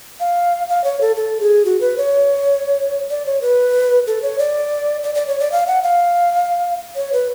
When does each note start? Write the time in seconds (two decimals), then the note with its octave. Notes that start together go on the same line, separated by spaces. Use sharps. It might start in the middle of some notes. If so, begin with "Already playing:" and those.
0.20 F5
0.69 F5
0.84 C#5
1.01 A4
1.16 A4
1.41 G#4
1.65 F#4
1.81 B4
1.98 C#5
3.10 D5
3.26 C#5
3.42 B4
4.07 A4
4.22 C#5
4.39 D5
5.03 D5
5.15 D5
5.27 C#5
5.40 D5
5.52 F5
5.67 F#5
5.83 F5
6.96 C#5
7.13 B4